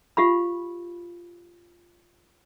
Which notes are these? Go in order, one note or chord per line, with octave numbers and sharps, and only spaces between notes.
F4 G4 F5 B5